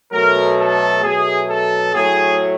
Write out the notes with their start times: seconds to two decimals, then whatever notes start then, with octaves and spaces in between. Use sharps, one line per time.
0.12 B2 F#3 A3 A#4
0.59 A4
1.03 B2 F#3 A3 G#4
1.49 A4
1.94 A2 F#3 A3 G#4